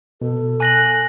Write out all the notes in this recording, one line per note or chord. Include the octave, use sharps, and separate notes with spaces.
B2 A4
G#5 F#6 A#6 F#7